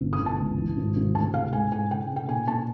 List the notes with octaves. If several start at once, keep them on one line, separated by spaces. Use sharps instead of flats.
G1
D#6
G1
A5
C#2
E3
G#1
G#1
D2 A5
C3 F5
G#2 G#5
G#2 G#5
C#3 G5
C#3
G5
A#2 G#5
A#2 A5